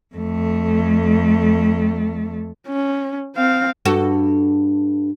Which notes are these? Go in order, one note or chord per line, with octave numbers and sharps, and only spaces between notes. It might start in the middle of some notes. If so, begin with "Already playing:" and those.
F2 A3
C#4
C4 F5
G2 F#4 A4